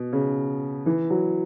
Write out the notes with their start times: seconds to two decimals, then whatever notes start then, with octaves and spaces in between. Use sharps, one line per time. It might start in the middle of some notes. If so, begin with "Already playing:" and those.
Already playing: B2
0.13 C#3
0.86 E3
1.10 F#3